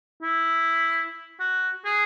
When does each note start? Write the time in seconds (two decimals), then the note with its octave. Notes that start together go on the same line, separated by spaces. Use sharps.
0.22 E4
1.40 F#4
1.85 G#4